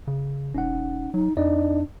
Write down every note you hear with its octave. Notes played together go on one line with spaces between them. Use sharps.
C#3
E1 C#4 D#4 F#5
F#3 D#4
F2 D4 D#4 D5 D#5